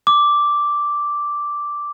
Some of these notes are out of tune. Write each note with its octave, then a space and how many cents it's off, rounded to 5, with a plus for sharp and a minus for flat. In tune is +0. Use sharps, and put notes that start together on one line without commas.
D6 -5